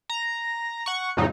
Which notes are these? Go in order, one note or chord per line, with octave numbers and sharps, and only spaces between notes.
A#5
F#5 C#6
F2 A2 C#3 F#3 D#4